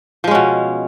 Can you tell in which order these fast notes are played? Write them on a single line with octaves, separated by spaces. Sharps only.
F3 G#3 C#4 B2